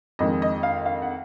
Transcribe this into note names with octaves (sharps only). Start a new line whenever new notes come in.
F2 D#3 G#3 D#5
D#5
F5
F5
F#5